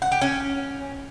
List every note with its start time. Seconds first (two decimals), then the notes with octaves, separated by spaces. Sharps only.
0.02 F#5
0.12 G4
0.21 C#4